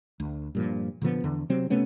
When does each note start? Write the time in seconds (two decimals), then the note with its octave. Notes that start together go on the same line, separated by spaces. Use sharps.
0.20 D2
0.55 G2 A#2 F3
1.02 A#2 D3 F3 B3
1.24 E2 D3
1.49 C3 F#3 C4
1.70 C3 A3 B3 C#4